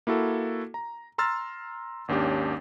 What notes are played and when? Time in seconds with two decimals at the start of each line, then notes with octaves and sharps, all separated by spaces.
0.07 A#3 E4 F#4 A4
0.74 A#5
1.18 A#5 C6 E6 F6 A6
2.08 G#1 D#2 C#4 D4 G4